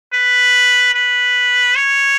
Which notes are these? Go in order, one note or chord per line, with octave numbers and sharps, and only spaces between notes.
B4
B4
C#5